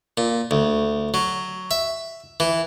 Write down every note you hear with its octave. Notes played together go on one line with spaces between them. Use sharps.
A#2
D2
F#3
E5
E3